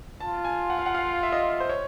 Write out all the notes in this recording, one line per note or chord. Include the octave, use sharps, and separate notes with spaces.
F4 A5
G#5
F#5
F5
F#5
F5
E5
D#5
C5
C#5